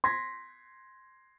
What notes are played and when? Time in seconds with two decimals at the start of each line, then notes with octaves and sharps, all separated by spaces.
0.04 C6 G#6 A#6 B6